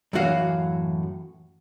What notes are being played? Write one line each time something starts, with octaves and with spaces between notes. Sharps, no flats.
F#2 A2 E3 F#4 F5